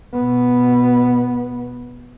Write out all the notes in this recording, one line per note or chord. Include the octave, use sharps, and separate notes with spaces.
B2 B3